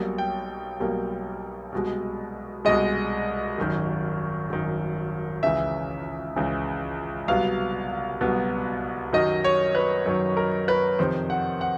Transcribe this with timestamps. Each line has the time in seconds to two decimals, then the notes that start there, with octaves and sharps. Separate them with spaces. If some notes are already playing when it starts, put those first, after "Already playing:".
Already playing: B1 B2 G3 A#3
0.18 G5
0.80 B1 B2 G3 A#3
1.72 C2 B2 G#3
2.65 C2 B2 G#3 D#5
3.58 G#1 F#2 D#3
4.50 G#1 F#2 D#3
5.43 C#2 C#3 E3 E5
6.36 C#2 C#3 E3
7.28 C2 B2 F#3 B3 F5
8.21 C2 B2 F#3 B3
9.13 F#2 D#3 F#3 D#5
9.44 C#5
9.75 B4
10.06 F#2 D#3 F#3
10.37 A#4
10.68 B4
10.99 F2 C3 D#3 C5
11.30 F#5
11.61 F#5